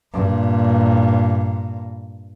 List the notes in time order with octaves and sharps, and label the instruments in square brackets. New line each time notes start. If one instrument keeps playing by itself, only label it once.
[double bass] G2 A#2